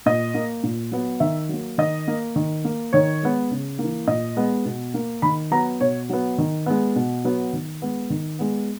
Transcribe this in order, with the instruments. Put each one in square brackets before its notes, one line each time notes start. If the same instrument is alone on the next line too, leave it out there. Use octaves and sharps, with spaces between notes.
[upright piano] A#2 D#5
A#3
A#2
F#3 B3
D#3 E5
F#3 A#3
D#3 D#5
A#3
D#3
A#3
D#3 C#5
G#3 B3
C#3
A#3
E3
A#2 D#5
G#3 B3
B2
A#3
D#3 B5
F#3 B3 A#5
B2 C#5
F#3 B3
D#3
G#3 B3
B2
F#3 B3
D#3
G#3 B3
D#3
G#3 B3